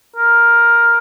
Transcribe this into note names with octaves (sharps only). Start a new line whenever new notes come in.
A#4